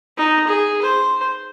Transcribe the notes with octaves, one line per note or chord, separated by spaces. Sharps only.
D#4
G#4
C5